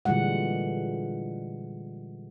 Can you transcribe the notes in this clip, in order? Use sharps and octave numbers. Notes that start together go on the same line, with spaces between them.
A#2 D3 E3 G3 G#3 F#5